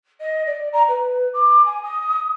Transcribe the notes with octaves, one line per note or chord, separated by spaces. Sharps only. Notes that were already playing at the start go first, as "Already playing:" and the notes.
D#5
D5
A#5
B4
D6
G#5
D#6